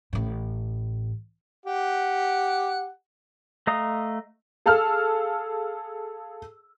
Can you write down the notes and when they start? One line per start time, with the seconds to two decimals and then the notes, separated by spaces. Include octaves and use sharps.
0.13 A1 A2
1.66 G4 F#5
3.67 A3 D#5 F5 A#5 D#6
4.66 G#4 A4 F5 E6 F6